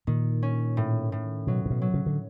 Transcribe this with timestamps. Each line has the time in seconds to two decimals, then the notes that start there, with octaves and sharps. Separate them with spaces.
0.07 A#2 D#3
0.43 C#4
0.77 A2
1.12 A2
1.47 B2 F#3
1.65 A#2
1.70 B2
1.82 F#3
1.94 C#3
2.06 D3